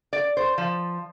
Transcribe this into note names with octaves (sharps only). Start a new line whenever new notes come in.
D5
C5
F3